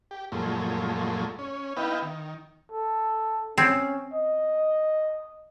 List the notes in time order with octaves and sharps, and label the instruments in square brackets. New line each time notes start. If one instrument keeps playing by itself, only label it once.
[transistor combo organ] G4
F#2 A#2 F3 G#3 A3
C#4
B3 D#4 E4 B4 F5 G5
D#3
[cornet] A4
[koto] C4 [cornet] C#4
[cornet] D#5